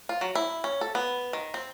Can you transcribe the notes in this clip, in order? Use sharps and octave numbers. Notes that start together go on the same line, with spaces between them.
F4
F#3
E4
C#4
A4
B3
D#3
C4